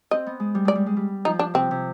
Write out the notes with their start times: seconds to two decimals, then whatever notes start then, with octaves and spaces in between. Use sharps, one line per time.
0.11 C4 D#5
0.26 B3
0.40 G#3
0.55 G3
0.65 G#3 D5
0.75 G3
0.86 G#3
0.97 G3
1.25 F3 D#4
1.39 D4
1.54 C3 C4
1.71 C3